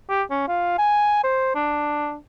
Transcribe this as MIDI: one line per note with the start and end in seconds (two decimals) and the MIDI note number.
0.10 0.23 67
0.31 0.43 61
0.48 0.77 65
0.79 1.20 80
1.24 1.52 72
1.55 2.16 62